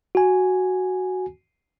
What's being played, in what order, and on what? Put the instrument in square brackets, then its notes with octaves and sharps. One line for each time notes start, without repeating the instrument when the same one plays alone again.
[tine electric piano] F#4 G#5